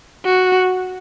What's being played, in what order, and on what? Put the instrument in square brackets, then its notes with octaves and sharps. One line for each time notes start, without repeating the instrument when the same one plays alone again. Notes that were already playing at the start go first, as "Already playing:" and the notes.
[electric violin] F#4